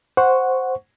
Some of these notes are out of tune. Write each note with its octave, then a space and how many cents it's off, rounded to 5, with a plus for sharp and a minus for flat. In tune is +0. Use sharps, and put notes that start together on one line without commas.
C5 +0 F#5 -5 C#6 +0